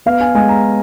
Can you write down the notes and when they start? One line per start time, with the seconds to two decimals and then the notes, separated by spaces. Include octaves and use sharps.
0.06 B3 F5
0.20 G#5
0.35 G#3 G#5
0.49 A#5